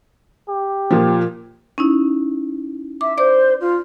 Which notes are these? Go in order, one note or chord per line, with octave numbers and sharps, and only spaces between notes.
G4
A#2 F3
C#4 D#4 E4
E5 D6
C5 D5 D6
F4